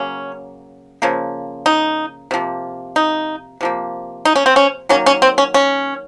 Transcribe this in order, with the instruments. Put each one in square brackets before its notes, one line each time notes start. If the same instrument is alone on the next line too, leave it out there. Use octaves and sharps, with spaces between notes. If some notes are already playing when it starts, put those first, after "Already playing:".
Already playing: [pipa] C#3 F#3 A#3 C#4
C#3 F3 A#3
D#4
C3 F3 A#3
D#4
C3 F3 A#3
D#4
C#4
C4
C#4
D#3 F#3 A#3 C#4
C#4
C4
C#4
C#4